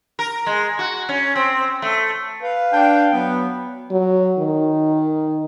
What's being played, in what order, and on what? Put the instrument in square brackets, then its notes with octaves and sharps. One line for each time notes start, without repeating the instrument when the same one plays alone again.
[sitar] A#4
G#3
F#4
C#4
C4
A3
[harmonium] B4 F5
[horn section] D4 G5
[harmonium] F#3 [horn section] B3
[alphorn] F#3
D#3